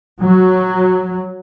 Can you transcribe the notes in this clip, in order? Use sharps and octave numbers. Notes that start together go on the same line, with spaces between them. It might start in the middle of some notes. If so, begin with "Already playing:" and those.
F#3